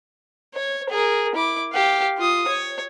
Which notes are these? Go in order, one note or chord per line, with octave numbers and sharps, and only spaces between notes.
C#5
G#4 A#4
E4 D6
G4 F5
F4 D#6
C#5